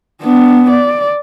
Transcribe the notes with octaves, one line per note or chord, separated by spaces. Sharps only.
B3 D4
D5